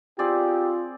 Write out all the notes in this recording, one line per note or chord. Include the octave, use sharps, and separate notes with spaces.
C4 F4 G4 G#4 D5